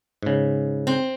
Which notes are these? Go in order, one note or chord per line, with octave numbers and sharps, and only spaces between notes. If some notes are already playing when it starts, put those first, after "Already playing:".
G#2 C#3
C4